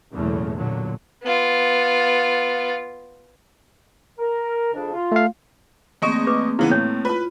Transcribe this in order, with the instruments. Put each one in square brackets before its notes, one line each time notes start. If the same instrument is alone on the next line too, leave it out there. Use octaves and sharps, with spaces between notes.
[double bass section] F#1 B1 E2 A2 C#3 A3
G1 A#2 D3 F#3
[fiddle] B3 F4
[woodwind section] A#4
F2 C#3 D4
F4
[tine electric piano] A3 F5
[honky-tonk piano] E2 D#5 C#6 [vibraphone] A3 A#3 C4
[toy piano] B4 D6
[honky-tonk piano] C#3 E3 B3 [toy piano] E4
[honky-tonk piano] A2 [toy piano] C#5
[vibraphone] F4 [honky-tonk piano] B4 B5